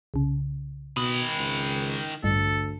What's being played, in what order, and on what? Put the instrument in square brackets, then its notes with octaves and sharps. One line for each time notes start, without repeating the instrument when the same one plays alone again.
[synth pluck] C2 C#3
[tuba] B2 [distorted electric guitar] D#3 B5 [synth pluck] D#6
[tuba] C#2
[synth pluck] A1 G2 [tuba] D2 [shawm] A4